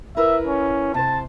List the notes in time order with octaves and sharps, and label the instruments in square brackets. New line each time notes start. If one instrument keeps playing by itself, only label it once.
[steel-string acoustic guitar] E4 A#4 B4 [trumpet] E5
[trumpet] C#4
[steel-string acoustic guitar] C3 C5 [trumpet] A5